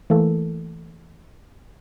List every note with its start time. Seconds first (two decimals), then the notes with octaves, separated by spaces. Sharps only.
0.10 E3 A3 A#3 A4